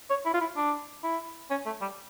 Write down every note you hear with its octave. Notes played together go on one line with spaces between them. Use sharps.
C#5
E4
F4
E4
D4
E4
C#4
A3
G3